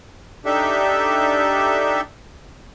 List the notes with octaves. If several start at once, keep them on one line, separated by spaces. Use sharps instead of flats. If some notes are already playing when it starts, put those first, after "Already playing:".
D4 D#4 G4 A4 E5